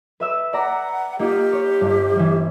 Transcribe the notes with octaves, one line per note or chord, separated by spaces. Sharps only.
B4 E5 E6
D5 F#5 A#5 B5
A#3 D#4 F4 G4
C#5
G1 G2
E3 G3